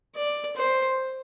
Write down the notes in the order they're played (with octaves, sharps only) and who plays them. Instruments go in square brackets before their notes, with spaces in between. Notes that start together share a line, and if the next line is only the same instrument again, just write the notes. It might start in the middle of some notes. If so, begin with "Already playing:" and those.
[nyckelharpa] D5
C5